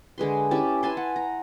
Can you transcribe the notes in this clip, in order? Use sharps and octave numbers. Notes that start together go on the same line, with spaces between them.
D3 G#3 B4 C6
C#4 E4 G4 A5
B4 G#5 A5 C6
F#5
A#5